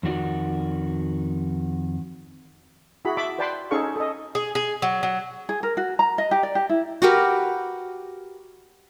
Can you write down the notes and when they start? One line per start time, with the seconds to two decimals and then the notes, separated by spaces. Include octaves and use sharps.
0.03 F2 D#3 F#4 D5
3.05 E4 F#4 G#4 B5
3.17 E5 A5 B5 D6
3.38 B4 D5 G5 A5 B5 C6
3.71 C#4 D#4 G#4 A4 F5 C#6
3.96 A4 D#5
4.35 G#4
4.55 G#4
4.82 F#3
5.03 F#3
5.49 G#4
5.63 A#4
5.77 F#4
5.99 A#5
6.18 D#5
6.31 G4
6.43 D5
6.55 G4
6.69 E4
7.02 F#4 G4 A#4 B4